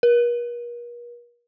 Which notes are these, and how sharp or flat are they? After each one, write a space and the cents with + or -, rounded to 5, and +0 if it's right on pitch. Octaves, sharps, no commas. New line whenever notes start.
A#4 +45